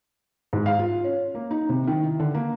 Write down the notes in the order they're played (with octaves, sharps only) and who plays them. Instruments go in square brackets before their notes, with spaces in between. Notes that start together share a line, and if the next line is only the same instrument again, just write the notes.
[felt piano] G#2
F5
F4
C#4
A#3
D#4
C3
D#3
E4
D3
A#3